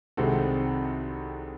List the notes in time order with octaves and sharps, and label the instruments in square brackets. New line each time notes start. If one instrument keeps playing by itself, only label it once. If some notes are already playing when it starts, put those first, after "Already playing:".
[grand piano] C2 C3 D#3 G#3 C4 F#4 A4